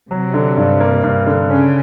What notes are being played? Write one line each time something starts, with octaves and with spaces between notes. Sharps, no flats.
C3 F#3
D3
G2
A#3
G2
D3
C#3 C#4